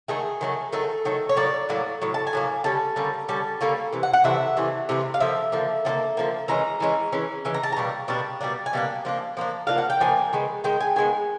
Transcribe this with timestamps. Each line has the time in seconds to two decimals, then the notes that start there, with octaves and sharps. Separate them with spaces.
0.08 D#3 F#3 A3 G#4
0.41 D#3 F#3 A3
0.72 D#3 F#3 A3 A4
1.05 D#3 F#3 A3
1.29 C#5
1.37 A2 F#3 A#3 D5
1.69 A2 F#3 A#3
2.02 A2 F#3
2.14 A5
2.27 G#5
2.33 A2 F#3 A#3
2.64 D3 G3 C#4 A5
2.96 D3 G3 A#3 C#4
3.28 D3 G3 C#4 A5
3.61 D3 G3 A#3 C#4
3.93 C3 E3
4.03 F#5
4.13 F#5
4.24 C3 E3 A3 D4 E5
4.57 C3 E3 A3 D4
4.89 C3 E3 A3 D4
5.14 F5
5.20 D3 F3 A#3 E5
5.52 D3 F3 A#3
5.85 D3 F3
5.89 A#3
6.17 D3 F3 A#3
6.48 E3 G#3 C#4 A#5
6.80 E3 G#3 C#4
7.12 E3 G#3 C#4
7.45 E3 G#3 C#4
7.54 A#5
7.63 A5
7.72 A#5
7.77 B2 G3 A#3 D4
8.08 B2 G3 A#3 D4
8.41 B2 G3 A#3 D4
8.66 G#5
8.73 B2 G3 A#3 D4
9.05 F3 A#3 D4
9.37 F3 A#3 D4
9.67 F3 A#3 D4 F5
9.78 F#5
9.90 G5
10.00 F3 A#3 D4 G#5
10.33 D#3 G#3 B3
10.64 D#3 G#3 G5
10.81 G#5
10.96 D#3 G#3 B3 G#5